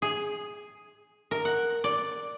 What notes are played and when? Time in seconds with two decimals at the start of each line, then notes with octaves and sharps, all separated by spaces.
0.02 G#4
1.31 A#4
1.45 F#5
1.84 D5